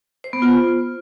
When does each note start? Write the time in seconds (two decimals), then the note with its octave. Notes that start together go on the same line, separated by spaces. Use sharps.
0.24 C5
0.33 B3
0.42 F4